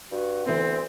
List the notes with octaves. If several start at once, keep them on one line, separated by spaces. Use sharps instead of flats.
G2 F#4
D2 E3 A3 B3 C4 C6